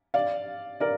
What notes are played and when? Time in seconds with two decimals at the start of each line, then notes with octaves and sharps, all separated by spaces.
0.14 D5 F5
0.80 A#4 D5